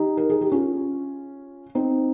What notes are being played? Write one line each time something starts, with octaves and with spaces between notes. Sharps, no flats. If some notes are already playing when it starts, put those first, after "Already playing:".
Already playing: D#4 G4
A#4
G#4
G4
C#4 F4
C4 D#4